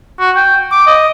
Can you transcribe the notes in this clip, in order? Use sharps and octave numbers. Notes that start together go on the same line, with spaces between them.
F#4
G5
D6
D#5